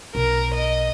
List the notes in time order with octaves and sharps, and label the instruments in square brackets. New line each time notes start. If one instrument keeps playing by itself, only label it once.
[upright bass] B1 [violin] A#4
[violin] D#5